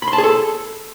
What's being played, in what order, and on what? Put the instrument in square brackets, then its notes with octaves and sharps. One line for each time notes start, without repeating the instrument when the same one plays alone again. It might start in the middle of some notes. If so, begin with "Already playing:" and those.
[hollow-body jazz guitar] B5
C6
A5
G#4
A4